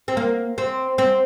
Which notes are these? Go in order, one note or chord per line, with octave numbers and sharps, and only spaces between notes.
C4
A#3
C4
C4